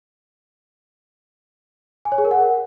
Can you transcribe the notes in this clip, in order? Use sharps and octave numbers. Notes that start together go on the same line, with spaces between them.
G#5
C#5
G#4
A#4
F#5